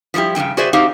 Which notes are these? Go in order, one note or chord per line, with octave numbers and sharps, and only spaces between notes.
F3 G3 G#3 E4 G4
G2 C#3 E3 C4 G5
F#4 G#4 B4 C5 D5 E5
C4 D#4 F#4 G4 C5 F5